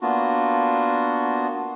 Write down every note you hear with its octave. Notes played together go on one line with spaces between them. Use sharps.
A#3 B3 D4 F4 F#4